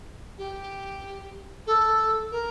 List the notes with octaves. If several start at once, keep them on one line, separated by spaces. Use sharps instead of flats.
G4
A4
A#4